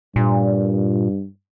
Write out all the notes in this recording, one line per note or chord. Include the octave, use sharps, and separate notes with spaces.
G2 A#2